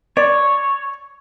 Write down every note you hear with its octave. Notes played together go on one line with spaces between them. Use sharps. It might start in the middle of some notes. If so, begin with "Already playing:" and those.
C#5 D5